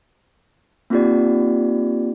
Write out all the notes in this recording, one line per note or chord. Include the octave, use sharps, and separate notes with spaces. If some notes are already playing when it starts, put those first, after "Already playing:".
A#3 C4 D#4 F4 G4 D5